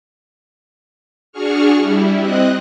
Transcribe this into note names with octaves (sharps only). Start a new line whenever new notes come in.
D4 F#4 G#4 C#6 F6
G3 E4
C4 D#5 F#6